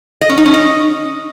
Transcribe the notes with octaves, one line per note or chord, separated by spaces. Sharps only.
D#5
C#4
D#4
C#4
D#5